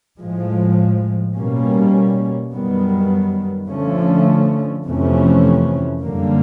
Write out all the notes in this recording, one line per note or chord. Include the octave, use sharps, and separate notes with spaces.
A2 F3 G#3
B2 G3 A#3 C#4
F#2 D#3 G3 B3
D3 F3 A3 C#4
F2 C3 E3 A3 C#4
F#2 D3 G3 A#3